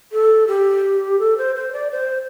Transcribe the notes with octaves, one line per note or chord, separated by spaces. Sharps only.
A4
G4
A4
C5
C5
D5
C5